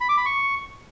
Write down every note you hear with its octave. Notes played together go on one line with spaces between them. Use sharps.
B5
D6
B5
C#6